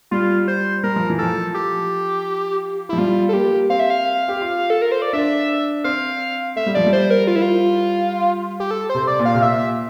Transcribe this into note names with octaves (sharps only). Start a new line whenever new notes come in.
G3 F4
C5
G3 A#4
F3
E3
F3 A4
G4
F3 E4
G3 F4
A4
A#3 G4
C4 F5
E5
F5
G4
F4
A4
A#4
C5
D5
D4 E5
C4 F5
A3 E5
G3
F3 D5
G3
C5
A#4
F4
E4
F4
G4
A4
C5
C3
D5
A#2
F5
C3
A#2 E5